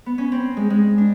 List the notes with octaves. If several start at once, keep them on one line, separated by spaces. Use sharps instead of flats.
B3
C#4
C4
G#3
G#3
D4